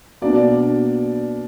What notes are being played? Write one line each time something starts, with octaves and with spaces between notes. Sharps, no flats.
B2 A#3 D4 D5